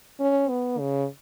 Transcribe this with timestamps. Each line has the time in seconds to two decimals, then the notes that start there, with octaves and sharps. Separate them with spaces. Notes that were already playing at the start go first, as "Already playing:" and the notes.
0.20 C#4
0.49 B3
0.79 C#3